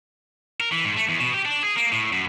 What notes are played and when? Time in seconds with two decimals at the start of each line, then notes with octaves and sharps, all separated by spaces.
0.60 A#4
0.72 E3
0.84 G#2
0.97 A3
1.09 E2
1.20 B2
1.34 G4
1.45 D4
1.63 G#4
1.76 A#3
1.92 A2
2.13 F#2